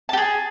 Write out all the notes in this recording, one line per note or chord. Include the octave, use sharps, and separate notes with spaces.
G4 G#4 A5